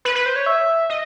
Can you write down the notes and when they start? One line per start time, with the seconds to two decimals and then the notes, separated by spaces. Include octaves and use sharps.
0.05 B4
0.15 B4
0.26 C5
0.36 C#5
0.46 E5
0.90 D#5